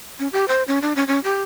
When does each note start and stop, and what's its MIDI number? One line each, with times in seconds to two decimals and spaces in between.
0.19 0.28 61
0.32 0.45 67
0.48 0.63 72
0.68 0.79 61
0.82 0.94 62
0.96 1.04 61
1.08 1.20 61
1.24 1.42 67